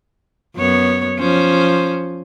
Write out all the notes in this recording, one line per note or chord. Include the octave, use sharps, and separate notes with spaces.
F#2 B3 C#5
F3 C#4 C5